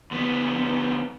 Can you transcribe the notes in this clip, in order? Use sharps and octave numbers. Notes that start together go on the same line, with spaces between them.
D2 B3